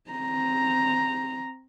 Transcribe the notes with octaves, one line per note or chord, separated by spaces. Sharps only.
C4 A#5